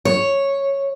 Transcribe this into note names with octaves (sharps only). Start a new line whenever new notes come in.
C#5